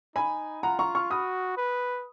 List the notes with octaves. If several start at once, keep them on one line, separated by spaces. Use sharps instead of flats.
D#4 G#5 B5
F4 F#5 A#5
A#5 C#6
C#6 F6
F#4 B5 D#6
B4